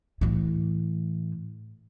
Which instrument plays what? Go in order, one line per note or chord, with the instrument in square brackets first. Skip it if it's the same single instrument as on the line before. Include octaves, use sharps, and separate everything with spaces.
[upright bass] A2 E3